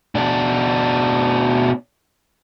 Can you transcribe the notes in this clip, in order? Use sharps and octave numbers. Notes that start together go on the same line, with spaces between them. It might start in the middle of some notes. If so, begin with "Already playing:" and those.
B2 D4